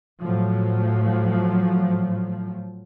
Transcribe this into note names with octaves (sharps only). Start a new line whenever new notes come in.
A2 F3 F#3